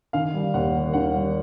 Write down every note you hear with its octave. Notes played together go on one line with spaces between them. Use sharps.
D#3 F5
G3
D#2 F#5
A#3
D#3 F#5
G3